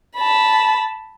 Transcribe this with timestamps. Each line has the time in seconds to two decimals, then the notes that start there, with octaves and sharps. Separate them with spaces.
0.17 A5 B5